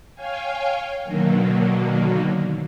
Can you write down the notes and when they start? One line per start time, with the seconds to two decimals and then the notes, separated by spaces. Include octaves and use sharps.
0.14 C#5 F5 G5 G#5
1.04 B2 D3 D#3 F#3 A#3